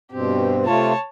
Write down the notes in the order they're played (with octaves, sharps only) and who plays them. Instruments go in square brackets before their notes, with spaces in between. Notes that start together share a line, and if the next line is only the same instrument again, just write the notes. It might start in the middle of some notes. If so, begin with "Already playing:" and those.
[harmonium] G2 B2 C4 [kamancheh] G4
[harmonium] C3 A3 F4 [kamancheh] C#5 A5